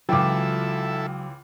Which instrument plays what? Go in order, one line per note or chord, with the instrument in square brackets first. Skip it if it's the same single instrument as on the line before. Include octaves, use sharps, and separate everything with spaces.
[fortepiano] C#2 E3 [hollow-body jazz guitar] F#3 F4 [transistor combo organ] E4 A4 [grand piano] G5 D6